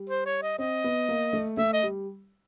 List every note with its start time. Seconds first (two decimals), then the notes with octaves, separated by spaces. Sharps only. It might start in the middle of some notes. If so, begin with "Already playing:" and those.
Already playing: G3
0.09 C5
0.26 C#5
0.43 D#5
0.58 C4 D#5
0.84 B3
1.09 A#3
1.33 A3
1.57 A3 E5
1.74 D#5
1.83 G3